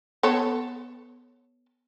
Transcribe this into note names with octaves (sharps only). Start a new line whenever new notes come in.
B3 A4 C#5